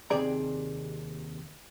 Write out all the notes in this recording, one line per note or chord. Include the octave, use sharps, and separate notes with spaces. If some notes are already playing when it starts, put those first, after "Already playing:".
D#2 C3 G#4 D5 A#5